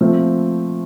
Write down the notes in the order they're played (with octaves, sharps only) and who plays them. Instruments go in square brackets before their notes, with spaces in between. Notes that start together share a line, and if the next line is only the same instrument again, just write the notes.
[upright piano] F3 A3 C4